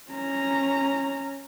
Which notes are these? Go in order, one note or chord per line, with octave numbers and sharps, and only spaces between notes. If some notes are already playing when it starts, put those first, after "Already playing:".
C#4 A#5